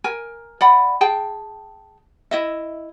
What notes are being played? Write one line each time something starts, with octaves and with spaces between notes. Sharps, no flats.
A#4 G#5
D5 F#5 B5
G#4 G5 A5
E4 D#5 E5